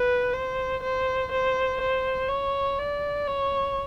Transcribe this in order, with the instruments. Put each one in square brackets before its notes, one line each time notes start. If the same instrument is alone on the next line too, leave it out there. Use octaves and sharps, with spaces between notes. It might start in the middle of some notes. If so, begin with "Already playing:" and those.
Already playing: [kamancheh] B4
C5
C5
C5
C5
C#5
D5
C#5